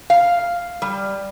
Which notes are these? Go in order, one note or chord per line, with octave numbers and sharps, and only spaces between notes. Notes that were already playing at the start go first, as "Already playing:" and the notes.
F5
G3